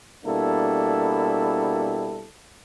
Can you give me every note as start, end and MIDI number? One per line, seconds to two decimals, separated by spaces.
0.25 2.25 47
0.25 2.25 55
0.25 2.25 58
0.25 2.25 62
0.25 2.25 64
0.25 2.25 69